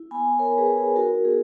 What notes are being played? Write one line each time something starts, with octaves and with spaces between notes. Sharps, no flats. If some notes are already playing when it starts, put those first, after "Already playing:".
Already playing: E4
B3 G#5 B5
E4 A#4 C#5
G#4 B4
E4
G#4
D#4 F#4 A#4
B3 G#4